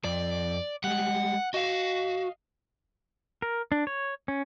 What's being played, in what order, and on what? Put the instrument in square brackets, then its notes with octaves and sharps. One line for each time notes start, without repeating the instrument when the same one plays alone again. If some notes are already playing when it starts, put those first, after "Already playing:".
[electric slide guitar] F2 [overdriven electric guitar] D5
[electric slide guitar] G3 G#3 [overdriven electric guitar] F#5
[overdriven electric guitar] F#4 [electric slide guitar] D#5 F5
[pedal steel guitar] A#4
D4
C#5
C#4